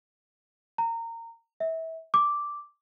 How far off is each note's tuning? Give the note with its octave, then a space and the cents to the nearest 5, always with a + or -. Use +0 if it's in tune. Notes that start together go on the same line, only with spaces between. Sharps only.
A#5 -20
E5 -25
D6 -5